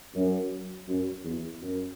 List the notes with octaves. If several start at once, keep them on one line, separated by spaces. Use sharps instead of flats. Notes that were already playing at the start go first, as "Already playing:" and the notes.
F#2
F#2
E2
F#2